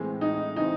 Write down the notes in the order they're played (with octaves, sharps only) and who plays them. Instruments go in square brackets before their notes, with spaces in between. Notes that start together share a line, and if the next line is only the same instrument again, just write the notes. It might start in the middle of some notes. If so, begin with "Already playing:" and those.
Already playing: [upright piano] A2 E3 G#3 C4
[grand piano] D#4
[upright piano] C#3 E3 C4 E4 [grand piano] D#4